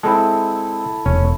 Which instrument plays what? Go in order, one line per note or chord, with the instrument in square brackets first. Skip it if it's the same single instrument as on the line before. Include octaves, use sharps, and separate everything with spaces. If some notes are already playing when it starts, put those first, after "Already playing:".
[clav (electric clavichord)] G#3 C4 [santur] E4 A4
[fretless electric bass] E1 [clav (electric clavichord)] C#4